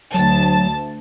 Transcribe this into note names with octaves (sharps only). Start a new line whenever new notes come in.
D2 F#3 A5